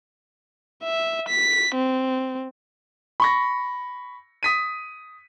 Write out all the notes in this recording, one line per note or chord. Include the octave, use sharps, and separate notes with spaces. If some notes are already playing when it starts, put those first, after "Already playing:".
E5
B6
C4
B5 C#6 A#6
D#6 B6 D#7